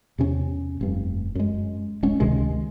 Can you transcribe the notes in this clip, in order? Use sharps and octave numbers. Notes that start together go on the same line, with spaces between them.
E2 C3 C#4
F1 G2
F#2 G#3
D1 G#3 C#4
C#2 C3 D#3 G#3